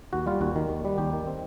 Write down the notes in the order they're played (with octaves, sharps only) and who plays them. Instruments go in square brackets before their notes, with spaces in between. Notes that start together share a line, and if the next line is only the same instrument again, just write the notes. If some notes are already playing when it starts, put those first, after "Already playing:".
[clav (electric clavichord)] D#2 F#4
G3 F4
D#2 F#4
D#3
D#2
G3
D#2 G4
D#3
C4